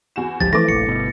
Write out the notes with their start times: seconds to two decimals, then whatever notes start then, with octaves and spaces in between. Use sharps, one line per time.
0.16 E2 F#4 E7
0.40 G1 C#2 F3 G4 A6
0.53 E3 F3 A3 E4 B4 C#6 D6 A#6
0.69 F1 A#1 C#7
0.86 G1 B2